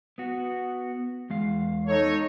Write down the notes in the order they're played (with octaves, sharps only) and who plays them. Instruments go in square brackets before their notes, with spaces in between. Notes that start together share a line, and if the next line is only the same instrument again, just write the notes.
[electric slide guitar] B3 F#4
E2 G#3 F5
[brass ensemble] D#4 A4 C#5